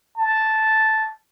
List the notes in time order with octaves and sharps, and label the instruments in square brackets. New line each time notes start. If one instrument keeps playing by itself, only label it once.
[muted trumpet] A5